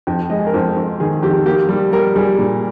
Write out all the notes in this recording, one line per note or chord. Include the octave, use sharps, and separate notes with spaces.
F2 G5
G#3 D#5
G#4
A#4
F2 C5
F2
D#3 G#4
F2 G4
A#3 G4
G3
G3 A#4
G3 G#4
A#2